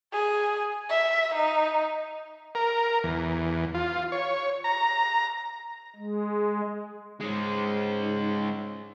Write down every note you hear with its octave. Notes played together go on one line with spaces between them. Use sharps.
G#4
E5
D#4
A#4
E2
F4
C#5
A#5
G#3
G#2 G#3 C#4